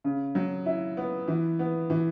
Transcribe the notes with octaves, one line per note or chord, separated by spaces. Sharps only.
C#3
F#3
E4
B3
E3
B3
E3